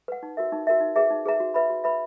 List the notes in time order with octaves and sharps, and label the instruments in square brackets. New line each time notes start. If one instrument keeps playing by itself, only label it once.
[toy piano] B4 F#5
D#4
F#4 A#4 E5
D#4
F#4 A#4 E5
D#4
G#4 B4 E5 A#5
D#4
G#4 B4 E5 A#5
F#4
B4 E5 B5
F#4
B4 E5 B5